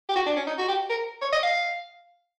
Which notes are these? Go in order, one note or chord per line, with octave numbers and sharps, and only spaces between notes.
G4
F#4
D4
C#4
D#4
F#4
G4
A#4
C#5
D#5
F5